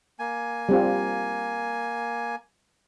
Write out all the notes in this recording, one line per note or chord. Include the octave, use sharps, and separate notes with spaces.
A#3 G#5
G3 C4 F4